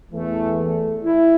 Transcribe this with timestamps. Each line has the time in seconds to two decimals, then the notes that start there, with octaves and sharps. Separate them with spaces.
0.11 E2 E3 A3
0.58 A3
1.04 E4